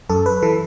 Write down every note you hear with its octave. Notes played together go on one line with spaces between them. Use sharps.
F#2 A4
B4
E3 A4